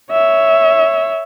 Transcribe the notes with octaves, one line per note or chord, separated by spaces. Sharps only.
C#5 E5